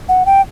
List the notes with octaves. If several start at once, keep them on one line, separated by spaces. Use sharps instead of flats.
F#5
G5